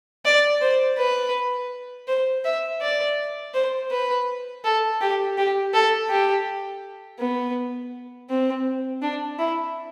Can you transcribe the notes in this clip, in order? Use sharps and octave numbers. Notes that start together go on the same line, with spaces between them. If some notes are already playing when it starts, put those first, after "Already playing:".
D5
C5
B4
C5
E5
D5
C5
B4
A4
G4
G4
A4
G4
B3
C4
D4
E4